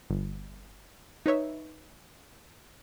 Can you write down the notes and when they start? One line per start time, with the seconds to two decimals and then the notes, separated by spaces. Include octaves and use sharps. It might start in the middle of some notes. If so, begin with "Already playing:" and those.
0.10 G1
1.26 D#4 B4 C#5 E5